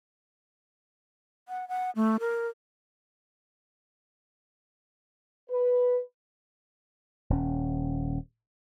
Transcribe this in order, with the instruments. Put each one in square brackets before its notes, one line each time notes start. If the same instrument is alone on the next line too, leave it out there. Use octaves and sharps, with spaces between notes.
[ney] F#5
F#5
A3
A#4
[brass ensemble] B4
[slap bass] D#1 C#4